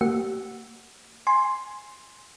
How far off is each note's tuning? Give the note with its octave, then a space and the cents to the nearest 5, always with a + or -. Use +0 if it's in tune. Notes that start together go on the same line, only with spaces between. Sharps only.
A#3 -35 G4 -35 F#5 -10
G#5 +0 C6 +5